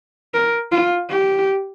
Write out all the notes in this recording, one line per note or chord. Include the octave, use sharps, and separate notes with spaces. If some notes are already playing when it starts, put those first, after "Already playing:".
A#4
F4
G4